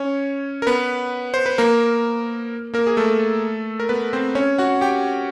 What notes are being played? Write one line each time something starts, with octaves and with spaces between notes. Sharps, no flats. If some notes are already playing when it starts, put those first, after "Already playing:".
Already playing: C#4 C#5
A#4
B3 B4
C5
B4
A#3 A#4
A#3 A#4
G#4
A3 A4
A#4
B3 B4
C4 C5
C#4 C#5
F#4 F#5
G4 G5